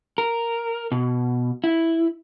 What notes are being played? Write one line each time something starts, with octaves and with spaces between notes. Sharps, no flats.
A#4
B2
E4